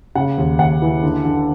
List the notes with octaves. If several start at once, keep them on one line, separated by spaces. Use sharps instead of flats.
C#3 F#5
D#2
D#2 F#5
E3
D3
D3